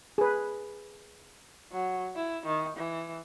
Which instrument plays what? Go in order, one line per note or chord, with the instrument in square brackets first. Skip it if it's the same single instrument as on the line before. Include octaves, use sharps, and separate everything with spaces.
[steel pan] G#4 B4
[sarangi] F#3
E4
D#3
E3